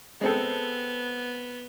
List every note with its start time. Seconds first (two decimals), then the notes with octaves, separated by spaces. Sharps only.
0.21 G#3 B3 C4 A4